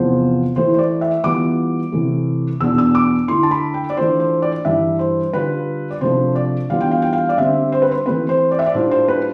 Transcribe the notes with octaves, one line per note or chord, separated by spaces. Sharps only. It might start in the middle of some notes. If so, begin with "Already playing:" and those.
Already playing: E2 C3 F3 B3 F4 C5
E3 A3 E4 C5
C5
D5
E5
E3 G3 B3 F4 D6
C3 E3 A3
E2 B2 B3 D4 E6
E6
D6
D3 A3 E4 C6
A5
B5
G5
D5
E3 A3 D4 F4 C5
C5
D5
G2 E3 G3 D4 E5
C5
D3 G3 D4 F4 B4
D5
C3 F3 A3 D4 C5
D5
E3 G3 B3 D4 F4 F5
G5
F5
G5
F5
D5
D3 G3 C4 E5
C5
B4
C5
E3 A3 C4 B4
C5
D5
E5
D5
A2 G3 D4 F4 C5
C5
B4